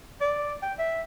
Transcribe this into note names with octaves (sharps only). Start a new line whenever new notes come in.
D5
G5
E5